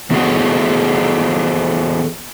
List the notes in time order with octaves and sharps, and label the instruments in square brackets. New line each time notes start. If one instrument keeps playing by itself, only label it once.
[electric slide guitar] E3 B3 F#4 G#4 A4